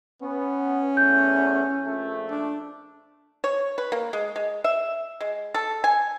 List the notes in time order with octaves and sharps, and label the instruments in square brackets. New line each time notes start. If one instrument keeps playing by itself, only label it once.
[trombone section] B3 [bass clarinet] C#4
[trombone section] E2 A3 [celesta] G6
[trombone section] A#1 A3
[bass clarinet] D4
[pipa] C#5
B4
A#3
G#3
G#3
E5
G#3
A4
G#5